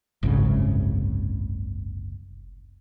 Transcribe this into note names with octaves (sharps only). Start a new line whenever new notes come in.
F#1 C2 G#2 C#3